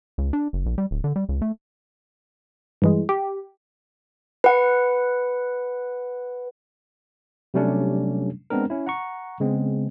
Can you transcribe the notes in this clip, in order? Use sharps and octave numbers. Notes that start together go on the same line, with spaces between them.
C#2
D4
F#1
A#1
G3
D1
D3
G3
C#2
A3
G2 E3 G#3
G4
B4 F#5
C3 F#3 G3 A3 C#4 D4
G#3 B3 C4 D4 A#4
C#4 E4
F#5 A#5 C#6
C#3 G#3 B3 C4